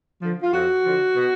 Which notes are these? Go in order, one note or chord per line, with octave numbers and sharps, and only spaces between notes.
D3 F3
F4
F2 F#4
D3 F3
B2